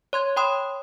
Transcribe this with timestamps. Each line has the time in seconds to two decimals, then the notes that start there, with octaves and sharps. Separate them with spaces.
0.13 C#5 C6 G#6
0.37 C#5 G5 B5 C6 D#6